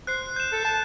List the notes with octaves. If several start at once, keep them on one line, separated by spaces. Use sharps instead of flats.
C5 F#6 C7
G6 E7
A4
A5